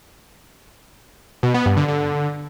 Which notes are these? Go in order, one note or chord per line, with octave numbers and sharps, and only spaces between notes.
B2
B3
G2
D3
D3